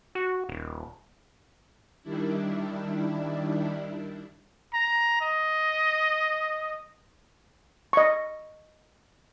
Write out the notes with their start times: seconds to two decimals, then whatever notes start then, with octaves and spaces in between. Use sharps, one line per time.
0.15 F#4
0.49 D#1
2.03 D#3 G3 D4 E4
4.74 A#5
5.22 D#5
7.93 D#5 C#6